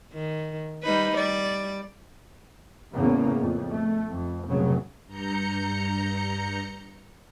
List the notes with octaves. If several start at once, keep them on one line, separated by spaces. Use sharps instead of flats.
D#3
G3 D#4 B4
G3 D5
E2 A2 C#3 A#3 C#4
F2
A3
F2
F1 A#1 C#3 F#3
G2 A#5 G6 C#7